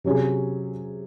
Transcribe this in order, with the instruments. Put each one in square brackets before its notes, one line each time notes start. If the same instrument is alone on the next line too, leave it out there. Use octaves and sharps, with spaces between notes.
[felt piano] C3 F#3 C#4 G#4